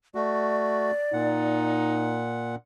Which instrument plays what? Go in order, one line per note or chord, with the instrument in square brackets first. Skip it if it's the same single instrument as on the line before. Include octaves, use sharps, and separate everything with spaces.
[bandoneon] A3 F#4 [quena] D5
[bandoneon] A#2 F#5 [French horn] D#4